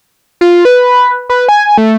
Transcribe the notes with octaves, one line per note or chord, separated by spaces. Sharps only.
F4
B4
B4
G#5
A3